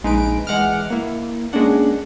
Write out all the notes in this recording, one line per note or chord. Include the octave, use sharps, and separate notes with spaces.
A#1 G#3 D#4 B4 D7
E3 G#3 F#5 D6 F6
A#3 E4
G#3 A#3 C#4 D4 F#5